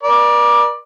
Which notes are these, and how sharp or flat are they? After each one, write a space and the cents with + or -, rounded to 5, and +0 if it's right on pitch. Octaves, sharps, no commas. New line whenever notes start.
A#4 +45 D5 +10